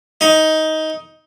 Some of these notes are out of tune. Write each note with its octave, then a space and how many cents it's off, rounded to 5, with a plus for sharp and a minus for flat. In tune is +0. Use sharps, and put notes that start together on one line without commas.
D#4 +15